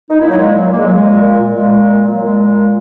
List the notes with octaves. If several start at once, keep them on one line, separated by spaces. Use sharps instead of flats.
D#4
A#2 E4
F#3
A#2 G#3
A#2 F#3
A#2 A#3
G#3
A#2 F#3
G#3
A#2
A#2
A#2
A#2 G#3
A#2
A#2
A#2
F#3
A#2 G#3
A#2
A#2